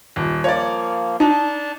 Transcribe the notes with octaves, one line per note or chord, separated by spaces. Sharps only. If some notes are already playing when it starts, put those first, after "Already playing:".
D#1
F3 A#3 C#5 D5
D4 D#4 A5